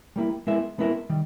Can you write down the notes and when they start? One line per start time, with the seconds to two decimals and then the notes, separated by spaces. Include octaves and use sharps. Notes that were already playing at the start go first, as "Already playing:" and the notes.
0.16 G3 A#3 E4
0.47 G#3 B3 E4 A#4 E5
0.78 G#3 B3 E4 A#4 E5
1.10 D#3 G3